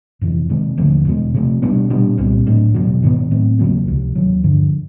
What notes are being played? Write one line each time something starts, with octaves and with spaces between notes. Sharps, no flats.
F2 C3 E3
C3 D#3 G#3
D#2 D3 F3 A3
E2 B2 G#3
C3 F3 A3
B2 G3 B3 D4
A#2 G3 B3 D4
C2 A#2 G3 C4
A2 F#3 A3 D4
E2 B2 F#3
G#2 D#3 G3 B3
A2 F#3 A3 C4
E2 C#3 F#3 A#3
C#2 C3 F3
D#2 D#3 F#3
G2 D3 F3